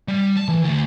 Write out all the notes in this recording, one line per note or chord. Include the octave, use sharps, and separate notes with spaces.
G3
A5
E3
D2